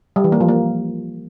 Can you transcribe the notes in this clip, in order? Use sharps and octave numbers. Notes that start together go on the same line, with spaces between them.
G3
E3
A#3
F3
A#3